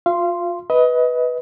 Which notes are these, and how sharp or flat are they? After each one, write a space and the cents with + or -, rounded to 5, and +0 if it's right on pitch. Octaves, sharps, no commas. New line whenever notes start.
F4 +25 F5 -30 C6 +0
B4 +0 D#5 +25